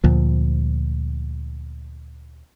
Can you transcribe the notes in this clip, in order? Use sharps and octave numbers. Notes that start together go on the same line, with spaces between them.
D2 A#2 F3